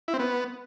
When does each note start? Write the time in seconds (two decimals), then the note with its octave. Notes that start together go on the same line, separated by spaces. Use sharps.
0.08 E4
0.14 C4
0.19 B3